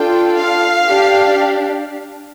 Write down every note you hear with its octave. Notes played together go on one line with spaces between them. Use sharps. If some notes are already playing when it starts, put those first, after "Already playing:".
Already playing: D4 F4 A4 G5
F5
D4 G4